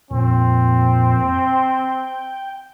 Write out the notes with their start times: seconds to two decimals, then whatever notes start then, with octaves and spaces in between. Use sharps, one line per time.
0.11 F2 A#2 C4
1.34 G5